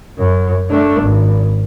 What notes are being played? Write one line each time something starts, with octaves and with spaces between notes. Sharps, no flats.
F#2
A3 D4
G#1